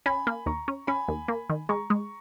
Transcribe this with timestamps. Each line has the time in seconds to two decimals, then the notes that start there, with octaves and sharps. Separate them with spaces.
0.06 C#4 G#5 B5
0.27 A#3
0.46 D#2 A#5 C#6
0.68 C#4
0.87 C#4 G#5 B5
1.08 D#2
1.28 A#3
1.50 D#3
1.69 G#3 A#5 C#6
1.90 G#3